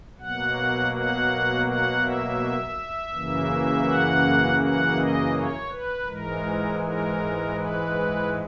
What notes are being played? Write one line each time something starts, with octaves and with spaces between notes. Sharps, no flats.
B2 F#3 A#3 F#5
F#5
F#5
E5
F#2 C#3 E3 A#3
F#5
F#5
D#5
C#5
B4
G#2 E3 G#3 A#4
A#4
B4